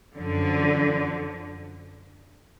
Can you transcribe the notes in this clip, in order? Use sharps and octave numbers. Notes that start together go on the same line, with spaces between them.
F#2 D3 F3